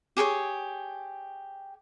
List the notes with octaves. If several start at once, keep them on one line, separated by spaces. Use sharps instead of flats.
G4 G#4 B4 C#5